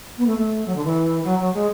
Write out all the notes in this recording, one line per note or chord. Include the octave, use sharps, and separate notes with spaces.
B3
A3
A3
F#3
D3
E3
F#3
F#3
G#3